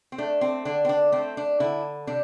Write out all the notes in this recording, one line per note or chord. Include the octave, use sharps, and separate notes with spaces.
C4
A3 D4
C4
D3 D4
C4
D4
A3 C4
D4
D3 E4
C3 D4